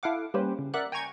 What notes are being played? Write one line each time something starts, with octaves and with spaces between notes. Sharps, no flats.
E4 A4 F5 F#5 D6
G3 A#3 C#4 G4 B4 C5
C#3
A#4 D5 E5 F#5 F#6
G5 G#5 A#5 C#6 G#6